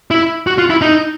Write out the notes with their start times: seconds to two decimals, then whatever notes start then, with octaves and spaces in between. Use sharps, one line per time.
0.11 E4
0.47 F#4
0.58 F4
0.70 E4
0.82 D#4